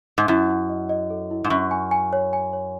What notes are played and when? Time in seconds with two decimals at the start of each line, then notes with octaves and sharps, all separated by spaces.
0.18 G#2
0.28 F#2 E4
0.50 E4
0.69 D#5
0.89 D#5
1.10 A4
1.31 E4
1.44 G#2
1.50 F#2 C#6
1.71 G#5
1.91 G#5
2.13 C#5
2.33 G#5
2.53 C#5